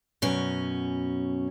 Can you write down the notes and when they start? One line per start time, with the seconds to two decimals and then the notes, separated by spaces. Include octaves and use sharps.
0.22 F#2 B2 C#4